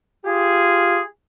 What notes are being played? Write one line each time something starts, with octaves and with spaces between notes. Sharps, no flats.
F4 G4 G#4